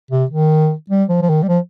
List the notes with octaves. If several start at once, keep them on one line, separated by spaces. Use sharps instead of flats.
C3
D#3
G3
F3
F3
D#3
G3
F3